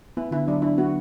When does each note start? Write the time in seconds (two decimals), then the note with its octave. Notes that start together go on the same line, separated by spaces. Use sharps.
0.17 B3 E4
0.31 D3 E4
0.47 F#3 D4
0.62 D4 E4
0.77 B3 F#4